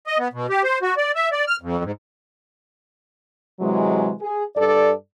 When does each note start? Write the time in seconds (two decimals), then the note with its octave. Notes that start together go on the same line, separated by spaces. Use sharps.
0.07 D#5
0.19 B3
0.33 B2
0.50 G4
0.64 C5
0.83 F#4
0.97 D5
1.15 E5
1.32 D5
1.47 F6
1.62 F2
1.84 G#2
3.60 C3 E3 F#3 G#3
4.21 G#4
4.56 G2 A4 D5